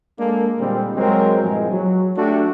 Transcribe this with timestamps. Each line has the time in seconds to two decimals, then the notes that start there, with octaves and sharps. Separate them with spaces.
0.18 G#3 A#3 D4 A4
0.59 A#2 D3 G3 G#3 C4
0.96 F#3 G#3 C4 A#4 C5
1.42 G2 A#2 E3 F3 G#3
1.71 F#3
2.17 A3 D4 F#4 G4 A4